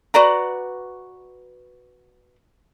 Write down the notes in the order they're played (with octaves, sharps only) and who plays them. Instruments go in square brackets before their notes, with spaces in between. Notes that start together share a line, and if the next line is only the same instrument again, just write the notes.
[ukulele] F#4 B4 D5 A#5